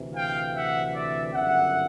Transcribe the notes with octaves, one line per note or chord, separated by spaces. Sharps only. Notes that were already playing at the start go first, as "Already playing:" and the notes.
Already playing: D2 C3 E3
F5 G5
E5 F#5
D5 E5
G1 F#2 C#3 E5 F#5